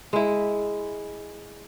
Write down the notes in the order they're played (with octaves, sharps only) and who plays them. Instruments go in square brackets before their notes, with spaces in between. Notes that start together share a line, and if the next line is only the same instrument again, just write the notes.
[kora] G#3 E4